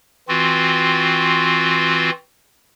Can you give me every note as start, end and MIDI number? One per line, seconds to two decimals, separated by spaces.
0.28 2.10 52
0.28 2.10 60
0.28 2.10 65
0.28 2.10 66